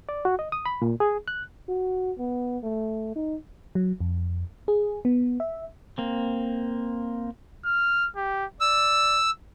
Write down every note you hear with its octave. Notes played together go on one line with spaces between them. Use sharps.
D5
F#4
D#5
D#6
B5
A#2
G#4
F#6
F#4
B3
A3
D#4
F#3
F2
G#4
B3
E5
A#3 C4
F6
G4
D5 E6